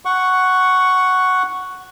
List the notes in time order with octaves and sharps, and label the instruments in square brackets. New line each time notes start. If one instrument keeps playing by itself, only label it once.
[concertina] F#5 C#6